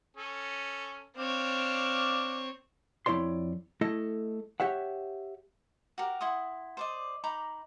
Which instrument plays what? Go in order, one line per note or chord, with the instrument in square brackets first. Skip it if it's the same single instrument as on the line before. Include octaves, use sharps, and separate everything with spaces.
[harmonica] C#4 A4
[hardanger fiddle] C4 C#5 [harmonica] D4 D5 F5
[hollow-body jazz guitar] F2 E4 C#5 D5 C6
A3 E4 A4 D#5
G4 C#5 E5 F#5
[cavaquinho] F#4 G4 A#4
E4 F#5 C6 D#6
C5 D5 D#5
D#4 A#5 B5 D6